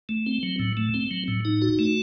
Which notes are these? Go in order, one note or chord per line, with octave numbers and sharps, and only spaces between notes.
A3
C4
F#3
A2
A3
C4
F#3
A2
D#4
F#4
A3